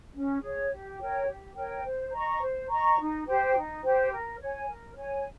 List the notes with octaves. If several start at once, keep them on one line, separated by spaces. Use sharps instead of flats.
C#4
G#4 C#5
G4
A#4 C#5 G5
G4
A#4 C#5 G5
C5
D#5 A#5 C#6
C5
D#5 A#5 C#6
D#4
G4 C5 G5
D#4
G4 C5 G5
A#4
C#5 G#5
A#4
C#5 G#5